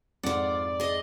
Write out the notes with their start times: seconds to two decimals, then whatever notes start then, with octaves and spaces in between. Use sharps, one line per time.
0.23 F2 G#2 F4 D5 F#5
0.80 G#4 D#5